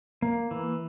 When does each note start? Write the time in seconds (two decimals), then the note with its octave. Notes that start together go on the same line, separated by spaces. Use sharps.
0.22 A#3
0.51 E3